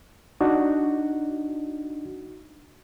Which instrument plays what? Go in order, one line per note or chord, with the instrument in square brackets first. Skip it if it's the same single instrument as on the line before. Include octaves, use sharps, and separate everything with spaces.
[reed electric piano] D4 D#4 F#4